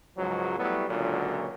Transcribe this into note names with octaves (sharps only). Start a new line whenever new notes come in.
C#2 G#2 F3 F#3
F#3 G3 A3 B3 E4
C#2 A#2 D3 F#3